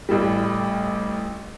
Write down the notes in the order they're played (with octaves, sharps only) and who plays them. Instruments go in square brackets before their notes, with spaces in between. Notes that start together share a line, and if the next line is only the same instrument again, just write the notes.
[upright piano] A1 A2 G3